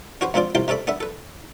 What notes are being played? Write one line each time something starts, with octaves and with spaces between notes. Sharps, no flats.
C#4 F#4 B4 C5
C#2 F3 C4 D4 F4 D5
C2 C3 F4 G5 A5 C6
C3 C#4 A4 D5 B5
B3 D4 B4 E5
A4 B4